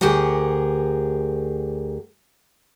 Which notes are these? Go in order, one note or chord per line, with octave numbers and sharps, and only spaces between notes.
D2 G4 G#4 A#4 F#5